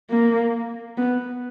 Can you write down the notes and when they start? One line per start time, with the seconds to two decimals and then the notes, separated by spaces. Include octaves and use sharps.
0.10 A#3
0.97 B3